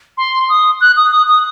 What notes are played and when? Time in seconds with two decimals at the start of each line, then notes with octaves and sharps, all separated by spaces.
0.18 C6
0.49 D#6
0.81 F#6
0.96 D#6
1.11 D#6
1.28 D#6